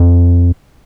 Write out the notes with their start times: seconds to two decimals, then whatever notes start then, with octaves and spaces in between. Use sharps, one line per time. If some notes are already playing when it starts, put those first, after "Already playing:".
Already playing: F2